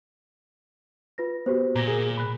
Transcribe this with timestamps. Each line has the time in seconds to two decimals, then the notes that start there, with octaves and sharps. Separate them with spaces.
1.18 F4 B4 A#6
1.46 B3 F#4 G4 C5
1.75 A#2 A#5 A#6
1.88 G#4 A#4
2.18 B5 F#6